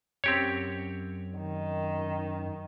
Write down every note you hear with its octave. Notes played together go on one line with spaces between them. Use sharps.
F#2 C4 G4 C#5
D#3